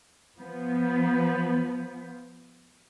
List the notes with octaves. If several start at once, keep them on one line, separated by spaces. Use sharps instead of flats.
F3 B3